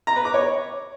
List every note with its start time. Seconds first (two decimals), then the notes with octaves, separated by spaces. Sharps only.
0.07 A#5
0.16 B4
0.25 D6
0.34 C#5